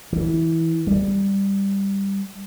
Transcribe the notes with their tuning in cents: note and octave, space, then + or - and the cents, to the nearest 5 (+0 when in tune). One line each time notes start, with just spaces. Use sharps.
E3 -15
G3 +10